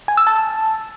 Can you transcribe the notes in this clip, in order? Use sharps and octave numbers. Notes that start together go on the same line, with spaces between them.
G#5
E6
A5